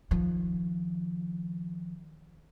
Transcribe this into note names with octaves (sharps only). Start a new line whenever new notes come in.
D#3 F3